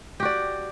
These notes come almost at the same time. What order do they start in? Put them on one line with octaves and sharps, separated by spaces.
G4 F#4 D5